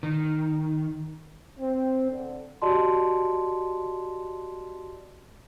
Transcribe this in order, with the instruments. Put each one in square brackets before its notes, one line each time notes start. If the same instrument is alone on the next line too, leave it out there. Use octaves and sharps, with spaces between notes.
[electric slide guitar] D#3
[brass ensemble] C4
D3
[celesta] F#4 G4 D5 D#5 A5 C6